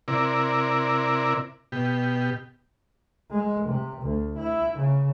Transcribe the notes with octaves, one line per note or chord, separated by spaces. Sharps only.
C3 E4 A#4 D5
B2 G4
G#3
C3
D2
E4
C#3